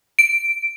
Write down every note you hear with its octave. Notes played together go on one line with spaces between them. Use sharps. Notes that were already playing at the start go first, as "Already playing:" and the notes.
D7